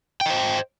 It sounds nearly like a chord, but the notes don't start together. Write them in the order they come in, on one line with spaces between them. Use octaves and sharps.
G5 D#5 C5